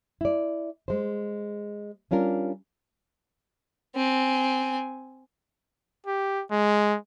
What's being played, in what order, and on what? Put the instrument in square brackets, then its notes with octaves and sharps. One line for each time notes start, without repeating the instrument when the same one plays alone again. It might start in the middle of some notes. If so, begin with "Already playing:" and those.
[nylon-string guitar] E4 D5
G#3 C5
G3 C#4 D4 F4 A#4
[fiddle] C4 G#5
[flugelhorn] G4
G#3